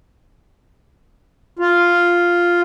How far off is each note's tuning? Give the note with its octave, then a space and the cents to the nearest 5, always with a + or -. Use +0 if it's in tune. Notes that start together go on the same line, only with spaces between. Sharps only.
F4 +0